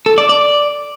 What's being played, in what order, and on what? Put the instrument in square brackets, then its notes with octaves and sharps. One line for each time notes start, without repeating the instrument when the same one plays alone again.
[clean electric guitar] A4
D5
D5